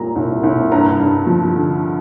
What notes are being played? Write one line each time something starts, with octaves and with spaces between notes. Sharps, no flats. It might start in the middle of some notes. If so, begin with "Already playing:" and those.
Already playing: C2 A#2 G3 A#5
C2
C2
G2 A#5
G2
F3
D3